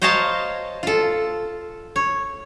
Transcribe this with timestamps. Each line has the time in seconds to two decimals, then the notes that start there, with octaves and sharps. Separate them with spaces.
0.02 C5 C#5 D#5 F5 A5 A#5
0.83 F4 A4
1.96 C#5